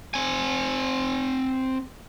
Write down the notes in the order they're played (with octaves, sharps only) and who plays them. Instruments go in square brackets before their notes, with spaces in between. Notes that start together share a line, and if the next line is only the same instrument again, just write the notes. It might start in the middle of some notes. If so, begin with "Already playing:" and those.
[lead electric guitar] C4 G#5